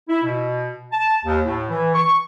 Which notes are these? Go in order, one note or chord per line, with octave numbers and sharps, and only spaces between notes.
E4
B2
A5
D#2
A2
E3
C#6